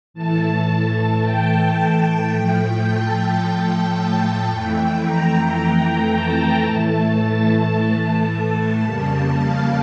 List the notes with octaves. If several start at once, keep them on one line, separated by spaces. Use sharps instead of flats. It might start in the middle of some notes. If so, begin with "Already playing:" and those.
A2 E3 A3 A5
G5
A2 F3 A3
A5
A5
F2 E3 A3 G5
A#5
A5
A2 E3 A3
A5
F2 C#3 G3 A#3
F5